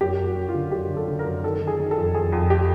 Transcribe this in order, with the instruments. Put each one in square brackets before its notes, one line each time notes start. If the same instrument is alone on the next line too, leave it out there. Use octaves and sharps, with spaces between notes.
[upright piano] F#2 G4
F#2
F#4
F#2
F4
D3
F#2 G4
D3
A4
D3
A#4
F#2
D#3 A4
D#3
G#4
D#3
A4
F2
F2 G#4
F2
G4